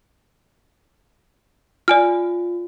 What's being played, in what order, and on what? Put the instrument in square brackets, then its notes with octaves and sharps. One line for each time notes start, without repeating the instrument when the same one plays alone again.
[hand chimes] F4 [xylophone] D5 G#5 F6